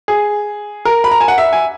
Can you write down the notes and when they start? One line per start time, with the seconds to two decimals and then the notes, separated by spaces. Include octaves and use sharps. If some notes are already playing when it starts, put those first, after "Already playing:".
0.08 G#4
0.85 A#4
1.04 B5
1.11 A#5
1.21 G#5
1.28 F#5
1.38 E5
1.53 G#5